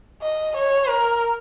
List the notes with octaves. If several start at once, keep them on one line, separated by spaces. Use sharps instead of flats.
D#5
C#5
A#4